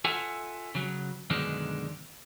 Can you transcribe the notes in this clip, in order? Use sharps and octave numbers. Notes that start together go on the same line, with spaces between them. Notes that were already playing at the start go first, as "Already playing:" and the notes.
F4 A4 E5 F#5 G#5
C#3 F#3
F#2 B2 D3 D#3 G#3 D4